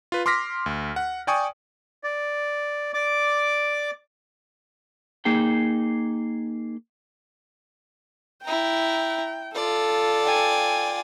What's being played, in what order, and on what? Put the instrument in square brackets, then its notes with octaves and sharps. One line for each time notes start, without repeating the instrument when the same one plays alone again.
[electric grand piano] F4 B4
C6 D6 F6 A#6 B6
D2
F#5
D5 G5 G#5 C#6 D#6
[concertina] D5
D5 D6
[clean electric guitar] A#3 D#4 G#4 G5
[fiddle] E4 A#5 [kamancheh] G5
[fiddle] F4 D5 [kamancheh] A4
[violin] G5 G#5